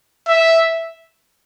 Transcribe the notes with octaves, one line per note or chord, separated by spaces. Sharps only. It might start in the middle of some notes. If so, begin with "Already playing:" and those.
E5